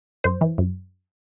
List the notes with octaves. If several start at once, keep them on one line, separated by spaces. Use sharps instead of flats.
F#2 C5
E3
F#2